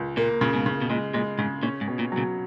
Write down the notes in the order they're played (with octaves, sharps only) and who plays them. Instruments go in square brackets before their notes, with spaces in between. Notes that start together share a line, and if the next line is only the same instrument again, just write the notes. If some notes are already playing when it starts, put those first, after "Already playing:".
Already playing: [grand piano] C#2
[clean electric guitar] A#2 [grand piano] A#3
[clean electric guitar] A#2 [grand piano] C#3
[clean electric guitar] G#2 B2
[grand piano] C#3
[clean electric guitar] B2
[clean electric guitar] A#2 [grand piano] G#3
[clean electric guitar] A#2 [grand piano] G#3
[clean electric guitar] G#2 [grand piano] C#3
[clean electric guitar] A#2 [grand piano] C#4
[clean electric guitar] G#2
[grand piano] B2
[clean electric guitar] A#2
[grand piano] F#3
[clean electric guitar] A#2 C#3